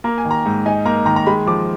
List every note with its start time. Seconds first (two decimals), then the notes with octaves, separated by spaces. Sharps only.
0.04 A#3 A#5
0.18 G#5
0.25 D#3
0.31 A#5
0.46 G#2
0.66 D#4 G#5
0.85 A#3 A#5
1.06 D#3 A#5
1.16 A#5
1.26 G#3 B5
1.47 F3 D6